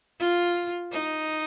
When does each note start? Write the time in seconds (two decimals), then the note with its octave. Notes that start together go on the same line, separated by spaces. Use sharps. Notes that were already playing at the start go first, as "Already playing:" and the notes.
0.19 F4
0.92 D#4